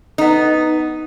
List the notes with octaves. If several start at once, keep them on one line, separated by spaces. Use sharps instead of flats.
B3 D#4